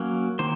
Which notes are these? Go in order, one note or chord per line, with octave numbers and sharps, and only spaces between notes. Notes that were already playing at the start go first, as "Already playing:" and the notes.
Already playing: F#3 A#3 C#4
D#3 A#3 C5